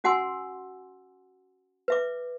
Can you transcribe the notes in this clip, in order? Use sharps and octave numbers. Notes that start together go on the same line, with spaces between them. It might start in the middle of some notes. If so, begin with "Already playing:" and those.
C#4 F#4 F#5 G#5 C6 E6
B4 E5 D6